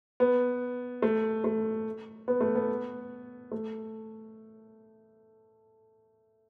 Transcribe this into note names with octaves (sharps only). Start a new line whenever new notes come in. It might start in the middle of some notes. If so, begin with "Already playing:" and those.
B3
A3
A3
B3
A3
B3
A3